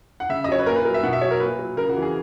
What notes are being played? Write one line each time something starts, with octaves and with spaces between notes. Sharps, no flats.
F#5
C#3 E5
D#5
F#3 C#5
B4
A#2 A#4
B4
F#3 A#4
E5
B2 F#5
E5
F#3 C#5
A#4
A#2 B4
F#3
C#3 A#4
F#4
E3
G#4